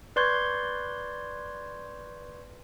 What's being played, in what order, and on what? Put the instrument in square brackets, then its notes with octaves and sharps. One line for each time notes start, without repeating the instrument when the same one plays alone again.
[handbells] B4 D5 C6 C#6 G6 G#6